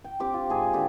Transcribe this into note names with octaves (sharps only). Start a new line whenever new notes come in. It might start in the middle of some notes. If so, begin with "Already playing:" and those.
G5
C4 G4 D6
F4
G#2 G#4 G#5
D3 G4